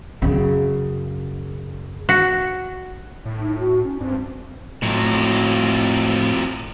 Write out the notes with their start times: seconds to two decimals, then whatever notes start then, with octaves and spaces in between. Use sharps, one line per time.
0.22 F#2 C#3
2.09 F#4
3.25 A2
3.40 D#4
3.59 F#4
3.84 C#4
4.00 G2 C4
4.83 F2 A2 F#3